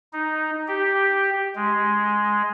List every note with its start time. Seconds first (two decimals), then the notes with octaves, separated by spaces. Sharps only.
0.13 D#4
0.68 G4
1.55 G#3